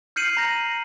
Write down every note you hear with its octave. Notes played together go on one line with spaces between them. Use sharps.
F6 G6 C7 C#7 D#7 F#7
A#5 G6 A#6